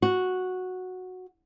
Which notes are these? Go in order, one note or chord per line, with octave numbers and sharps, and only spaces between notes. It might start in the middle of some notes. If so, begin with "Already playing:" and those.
F#4